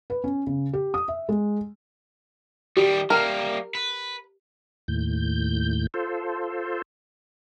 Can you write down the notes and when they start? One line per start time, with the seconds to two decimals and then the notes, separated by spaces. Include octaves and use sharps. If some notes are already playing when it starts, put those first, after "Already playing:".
0.10 B4
0.24 C#4
0.47 C#3
0.73 G4
0.94 D#6
1.08 E5
1.29 G#3
2.77 D#3 G3 G4
3.10 G3 A#3 A#4
3.75 B4
4.88 D#2 A2 G6
5.94 F4 A4 C5